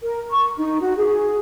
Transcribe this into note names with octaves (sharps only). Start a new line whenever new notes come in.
A#4
C#6
D#4
F#4
G#4